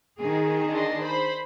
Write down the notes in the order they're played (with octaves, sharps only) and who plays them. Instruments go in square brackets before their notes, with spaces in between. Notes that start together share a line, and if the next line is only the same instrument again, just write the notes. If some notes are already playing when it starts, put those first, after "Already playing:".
[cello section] D#3 G#4
[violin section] D4 D#5 C6
C5 B5